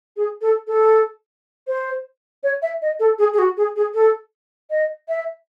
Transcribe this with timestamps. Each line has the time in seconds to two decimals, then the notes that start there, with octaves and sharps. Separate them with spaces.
0.17 G#4
0.41 A4
0.67 A4
1.67 C5
2.43 C#5
2.62 E5
2.82 D#5
3.00 A4
3.19 G#4
3.33 G#4
3.39 F#4
3.57 G#4
3.76 G#4
3.94 A4
4.70 D#5
5.09 E5